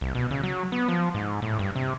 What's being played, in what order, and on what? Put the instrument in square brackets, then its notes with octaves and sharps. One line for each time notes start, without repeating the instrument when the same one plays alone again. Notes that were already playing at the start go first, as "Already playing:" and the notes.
[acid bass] C2
B2
C#3
F#3
B3
F3
G#2
A2
G2
C3